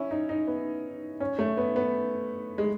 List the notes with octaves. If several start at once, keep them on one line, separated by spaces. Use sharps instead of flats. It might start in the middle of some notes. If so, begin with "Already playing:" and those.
Already playing: C#4 E4
D#4
D#4
B3
C#4
A3
B3
B3
G#3